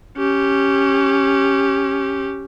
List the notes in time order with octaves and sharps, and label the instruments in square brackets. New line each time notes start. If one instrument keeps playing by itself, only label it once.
[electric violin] C#4 G4